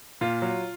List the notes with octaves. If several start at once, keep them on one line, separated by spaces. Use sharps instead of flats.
A#2 F4
F#3